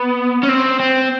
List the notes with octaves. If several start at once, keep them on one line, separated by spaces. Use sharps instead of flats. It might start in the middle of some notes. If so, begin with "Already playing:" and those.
Already playing: B3
C#4
C4
C4